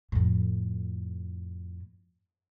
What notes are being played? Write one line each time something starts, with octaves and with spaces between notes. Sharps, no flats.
F2 A2